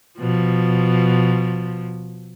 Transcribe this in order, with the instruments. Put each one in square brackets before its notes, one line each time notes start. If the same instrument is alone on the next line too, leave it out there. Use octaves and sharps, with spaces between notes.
[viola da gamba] B2 F3